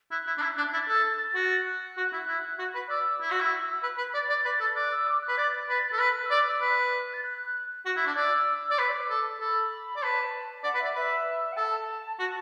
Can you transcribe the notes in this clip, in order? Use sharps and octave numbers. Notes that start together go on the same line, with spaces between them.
E4 F#6
E4
D4
E4
D4
E4 A6
A4
F#4
F#6
F#4
E4
E4
F#4
B4
D5 E6
E4
F#4
E4
B4
B4
D5 A6
D5
B4
A4
D5 F#6
E6
D6
F#6
B4
D5 A6
B4
A4
B4 F#6
F#6
D5 E6
D6
E6
B4 F#6
A6
F#6
F#4 F#6
E4
D4 F#6
D5 E6
D5
B4 D6
A4
A4 B5
D5
B4 A5
D5 F#5
B4
D5 E5
B4 E5
F#5
A4 A5
F#4 A5